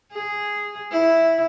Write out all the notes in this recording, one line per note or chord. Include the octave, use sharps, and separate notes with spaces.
G#4
E4